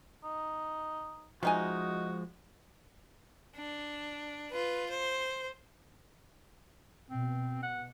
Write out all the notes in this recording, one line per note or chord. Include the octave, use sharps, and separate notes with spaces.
D#4
C3 F3 G#3 D#4 F#4 G#5
D4
F4 B4
C5
B2 C4
F#5